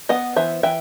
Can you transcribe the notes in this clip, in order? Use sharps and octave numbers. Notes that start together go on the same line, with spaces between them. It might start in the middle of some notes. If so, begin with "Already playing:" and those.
B3 D#5 F#5
E3 C5 E5
E3 E5 G5